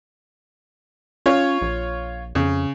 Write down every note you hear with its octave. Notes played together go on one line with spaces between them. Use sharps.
C#4 F4 C#5
A#1
F2 C#3